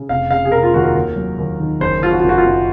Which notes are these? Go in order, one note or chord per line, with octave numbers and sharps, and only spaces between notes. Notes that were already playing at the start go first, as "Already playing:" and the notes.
Already playing: C#3
F1 F5
C#3 F5
G#4
F1 A#4
F4
D#2 F#4
A#4
D#2
F#3
D#2
D#3
F#1 C5
F3 F4
F#4
F#1 F4
F#4
F4
F#2